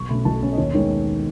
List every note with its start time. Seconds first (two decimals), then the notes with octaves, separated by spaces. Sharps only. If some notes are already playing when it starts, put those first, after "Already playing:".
Already playing: B1 C#6
0.09 B2 A3 C#4 B5
0.25 B1 A5
0.42 B2 A3 C#4
0.53 D#5
0.58 D#2 C#5
0.74 D#3 G#3 B3 C#5